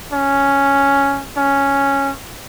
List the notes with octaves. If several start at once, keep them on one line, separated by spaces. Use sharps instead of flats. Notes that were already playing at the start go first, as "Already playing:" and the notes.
C#4
C#4